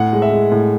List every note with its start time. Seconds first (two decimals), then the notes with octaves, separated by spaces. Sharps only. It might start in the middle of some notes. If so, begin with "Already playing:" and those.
Already playing: A2 F#5
0.13 G#3
0.22 E5
0.32 G#3
0.52 A2